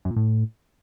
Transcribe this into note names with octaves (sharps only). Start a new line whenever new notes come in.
F#2
A#2
A2